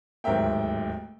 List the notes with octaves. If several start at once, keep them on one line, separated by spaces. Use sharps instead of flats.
D1 D#2 G#2 A#4 E5 G5